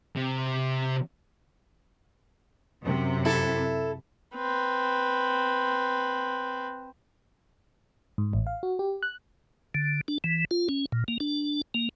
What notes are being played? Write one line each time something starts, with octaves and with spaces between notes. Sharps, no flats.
C3
F#2 C3
E4 A4
C4 B4
G#2
A1
F5
F#4
G4
F#6
D3
D4
E3
F4
C#4
A#2
A#3
D4
A#3